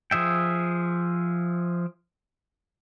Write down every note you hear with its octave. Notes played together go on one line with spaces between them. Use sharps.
F3 G#4 E5 G5